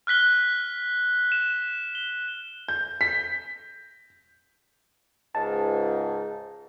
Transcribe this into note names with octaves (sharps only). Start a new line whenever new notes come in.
F6 F#6 B6 G7
E7
G7
G6
B6
C#2 G#2 A5